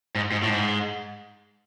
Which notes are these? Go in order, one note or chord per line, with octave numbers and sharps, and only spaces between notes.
G#2
G#2
A2
G#2